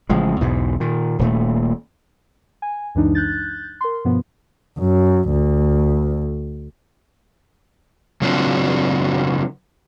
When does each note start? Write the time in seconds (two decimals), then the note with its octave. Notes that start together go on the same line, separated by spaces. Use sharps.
0.09 A1 C#3 F3 G#3
0.41 B1 E2 G#2 B2
0.80 A#2 D#3
1.19 D#1 A#2 A3
2.62 G#5
2.95 C#2 F#2 E3 G#3 D4 D#4
3.15 F#6 G6 A6
3.81 A#4 C6
4.05 G2 B2 F3 B3
4.79 F#2
5.31 D2
8.21 C#3 F#3 C4 D4 F4 F#4